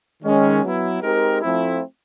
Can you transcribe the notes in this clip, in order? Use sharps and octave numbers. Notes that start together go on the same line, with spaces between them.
D#3 G#3 C#4
F#3 B3 E4
G#3 C4 D#4 G4 A#4
F3 A3 C4 E4